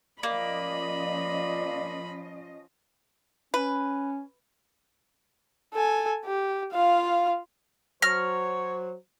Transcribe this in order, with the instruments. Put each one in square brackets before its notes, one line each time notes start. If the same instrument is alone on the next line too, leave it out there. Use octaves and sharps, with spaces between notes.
[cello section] F3 C#4 D#5 [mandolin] A#3 [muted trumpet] D5 [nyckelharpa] B5
[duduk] C#4 [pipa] B4
[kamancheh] A4 G#5
G4
F4 F5
[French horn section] F#3 C5 [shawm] C#5 [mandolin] F6 [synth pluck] A#6